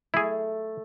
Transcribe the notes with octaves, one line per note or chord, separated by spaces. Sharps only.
A3 E4 G#4